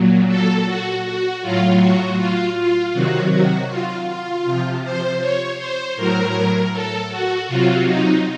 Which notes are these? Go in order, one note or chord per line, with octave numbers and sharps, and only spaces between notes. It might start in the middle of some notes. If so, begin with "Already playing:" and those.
Already playing: A#2 F#3
A4
F#4
F#4
A2 F#3 F4
F#4
F4
F4
C3 D#3 F#3 F#4
F#4
F4
F4
C3 F3
C5
C#5
C5
A2 F#3 A#4
A4
F#4
C3 F#3 F4
D#4